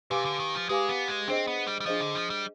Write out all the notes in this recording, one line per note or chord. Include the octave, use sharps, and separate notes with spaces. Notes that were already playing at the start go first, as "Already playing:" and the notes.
C3 G4 B4 F5 G#5 D6
D3
D#3
F3
G#3 G4 B4 F5 G#5 D6
B3
G#3
C4 D4 G#4 C5 D#5
B3
G3
G3
F3 D4 G#4 C5 D#5
D3
F3
G3